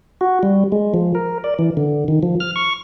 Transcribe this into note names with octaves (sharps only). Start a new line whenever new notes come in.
F#4
G3
G#3
F3
A#4
D5
E3
D3
D#3
F3
F6
C#6